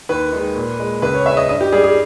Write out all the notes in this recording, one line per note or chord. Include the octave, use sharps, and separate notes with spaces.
D#2 B4
D#3 G#3
A#2
G#3
C#2 B4
C#5
C#3 G#3 E5
D#5
G2 D#5
G4
G3 G#4
G#4